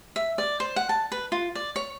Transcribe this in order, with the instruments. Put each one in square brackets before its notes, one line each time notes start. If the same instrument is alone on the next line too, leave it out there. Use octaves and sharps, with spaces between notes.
[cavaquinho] E5
D5
C5
F#5
A5
B4
F4
D5
C#5